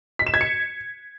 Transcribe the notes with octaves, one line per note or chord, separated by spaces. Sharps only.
B6
E7
G#6
C#7